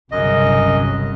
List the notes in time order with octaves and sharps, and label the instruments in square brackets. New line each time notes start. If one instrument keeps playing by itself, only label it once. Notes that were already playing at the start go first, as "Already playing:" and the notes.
[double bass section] G1 C2 C#3 [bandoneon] F#2 D#5